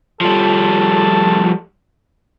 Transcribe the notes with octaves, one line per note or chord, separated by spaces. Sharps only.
F3 G3 A4